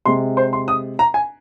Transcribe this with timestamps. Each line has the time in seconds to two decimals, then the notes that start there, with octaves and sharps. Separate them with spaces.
0.05 C3 G#3 C6
0.37 C5
0.53 C6
0.68 D#6
0.99 A#5
1.14 G#5